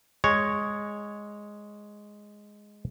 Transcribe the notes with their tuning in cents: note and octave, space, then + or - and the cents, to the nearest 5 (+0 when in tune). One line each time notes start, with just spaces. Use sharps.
G#3 +0 C#5 +0